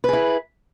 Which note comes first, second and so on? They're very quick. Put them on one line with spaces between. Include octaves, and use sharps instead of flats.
B4 G#4 E4